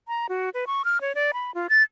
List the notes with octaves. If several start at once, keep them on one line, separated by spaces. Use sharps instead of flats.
A#5
F#4
B4
C#6
F6
C#5
D5
B5
F4
A6